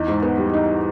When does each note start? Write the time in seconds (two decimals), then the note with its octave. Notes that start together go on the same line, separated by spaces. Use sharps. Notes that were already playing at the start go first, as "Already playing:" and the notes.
Already playing: E2 D#4
0.08 G#2
0.22 B3
0.37 G3
0.54 D#4